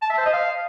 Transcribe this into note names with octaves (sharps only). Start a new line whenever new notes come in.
A5
E5
C5
D#5
F5